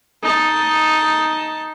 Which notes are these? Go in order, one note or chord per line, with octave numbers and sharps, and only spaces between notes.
D#4 A5